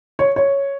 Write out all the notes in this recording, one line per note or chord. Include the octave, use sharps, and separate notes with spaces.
C#5
C#5